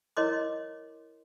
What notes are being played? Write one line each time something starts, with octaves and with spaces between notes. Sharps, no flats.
E4 A#4 C#5 D#5 C6 D6